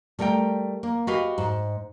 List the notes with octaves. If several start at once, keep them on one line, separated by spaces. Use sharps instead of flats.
G3 A3 A#4 F#5 G5
A#3
F#4 G4 B4 D#5 F5
G#2